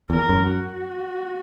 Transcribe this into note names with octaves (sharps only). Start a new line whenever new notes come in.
E2 A#4
F#2
F#4